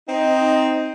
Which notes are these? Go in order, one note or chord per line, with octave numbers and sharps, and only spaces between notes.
C4 D#4